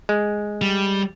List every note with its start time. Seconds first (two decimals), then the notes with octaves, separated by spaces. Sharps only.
0.09 G#3
0.62 G3